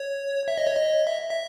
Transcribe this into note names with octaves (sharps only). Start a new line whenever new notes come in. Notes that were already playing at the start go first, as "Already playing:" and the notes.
Already playing: C#5
E5
D#5
C#5
D#5
E5
E5